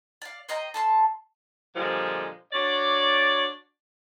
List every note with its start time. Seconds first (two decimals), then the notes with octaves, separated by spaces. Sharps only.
0.22 D5 F5
0.49 C5 D#5 G5 A#5
0.74 A4 A5 C6
1.75 A#2 D3 F3 G3 G#3
2.53 D4 F#4 C#5 D5